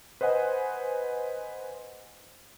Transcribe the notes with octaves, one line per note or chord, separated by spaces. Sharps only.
B4 C5 D#5 F#5 G#5